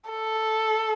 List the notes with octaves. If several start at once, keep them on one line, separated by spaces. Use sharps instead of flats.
A4